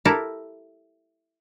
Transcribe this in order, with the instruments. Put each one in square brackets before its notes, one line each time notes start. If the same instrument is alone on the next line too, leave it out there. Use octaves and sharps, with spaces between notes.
[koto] E4 G4 A4 A#4